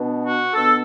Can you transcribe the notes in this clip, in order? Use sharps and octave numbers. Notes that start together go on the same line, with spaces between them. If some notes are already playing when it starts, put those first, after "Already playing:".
Already playing: B2 B3 D4
F#4
B2 B3 D4 A4